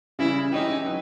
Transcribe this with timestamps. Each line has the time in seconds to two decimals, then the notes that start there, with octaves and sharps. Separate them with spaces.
0.19 C#3 E3 G3 E4
0.52 E3 G#3 C#4 D#4 E4 G4
0.86 F#3